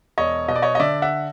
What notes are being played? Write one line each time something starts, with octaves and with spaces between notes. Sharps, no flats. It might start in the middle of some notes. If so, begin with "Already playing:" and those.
E1 C#5 D#5
B2 D#5
D5
C#5 D#5
D#5
D3 D5 E5
E5 F#5